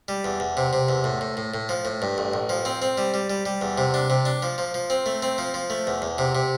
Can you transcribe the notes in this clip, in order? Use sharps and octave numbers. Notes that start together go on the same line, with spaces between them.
G3
E2
E2
C3
C3
E2
A2
A2
A2
A2
F3
A2
G2
A1
A1
F3
C4
C4
G3
G3
G3
G3
E2
C3
D4
C3
D4
F3
F3
F3
C4
A3
C4
F3
F3
A3
E2
E2
C3
C3